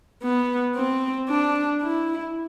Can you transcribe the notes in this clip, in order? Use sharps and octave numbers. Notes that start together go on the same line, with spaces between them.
B3
C4
D4
E4